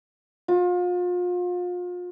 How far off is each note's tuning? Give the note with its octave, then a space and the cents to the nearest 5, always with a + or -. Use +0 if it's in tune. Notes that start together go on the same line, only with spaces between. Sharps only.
F4 +35